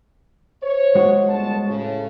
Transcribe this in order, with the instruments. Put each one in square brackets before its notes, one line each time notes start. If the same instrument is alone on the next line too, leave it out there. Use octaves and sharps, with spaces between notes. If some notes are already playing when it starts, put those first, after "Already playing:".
[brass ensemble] C5 C#5
[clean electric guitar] G#3 F#4
[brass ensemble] G1 A5
A2 C#3